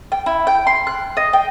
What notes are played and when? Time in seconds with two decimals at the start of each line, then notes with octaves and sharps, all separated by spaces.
0.12 G5
0.26 E4
0.47 G5
0.67 C6
0.87 F#6
1.17 D#5
1.33 G5